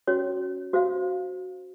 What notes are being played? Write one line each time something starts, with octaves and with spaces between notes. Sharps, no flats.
C#4 F#4 C#5
F#4 C5 F5